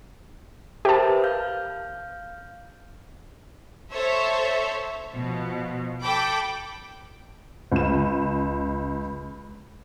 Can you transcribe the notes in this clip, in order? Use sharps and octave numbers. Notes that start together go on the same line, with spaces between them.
G4 A#4 C5 E5 A5
B4
F5 F6 G6
A4 C5 C#5 E5
B2 F3
A4 G5 B5 D6
C#2 E7